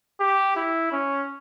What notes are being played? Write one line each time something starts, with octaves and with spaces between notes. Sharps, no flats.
G4
E4
C#4